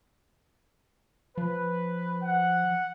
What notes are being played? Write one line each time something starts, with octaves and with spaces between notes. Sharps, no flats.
F3 B4
F#5